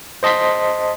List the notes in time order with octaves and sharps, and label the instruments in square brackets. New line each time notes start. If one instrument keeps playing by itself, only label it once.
[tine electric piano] C5 D#5 A5 C6 B6